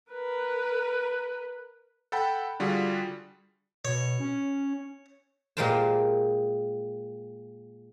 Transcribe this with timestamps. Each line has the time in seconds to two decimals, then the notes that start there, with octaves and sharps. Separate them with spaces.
0.12 A#4 B4
2.12 A4 F#5 G5 A5 B5
2.60 D3 G3 F4 F#4 G#4
3.85 B2 C#5
4.20 C#4
5.57 A#2 G#3 G4 A#4 C5 A5